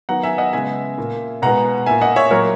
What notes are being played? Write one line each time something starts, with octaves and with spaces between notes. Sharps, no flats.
D#3 F#3 B3 F#5 A#5
E5 G#5
D#5 F#5
C#3 G#3 B3 E5 G#5
A#2 A#3
B2 G#3 B3 F#5 A#5
A#2 A#3 E5 G#5
D#5 F#5
C#5 E5
A#2 F#3 A#3 A#4 C#5